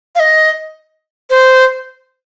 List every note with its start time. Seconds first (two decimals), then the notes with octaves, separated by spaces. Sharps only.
0.15 F5
0.20 D#5
1.30 C5